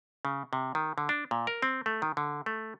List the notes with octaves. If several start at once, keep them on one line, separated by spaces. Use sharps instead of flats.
C#3
C3
D#3
D3
D4
A#2
A#4
C4
A3
D#3
D3
A3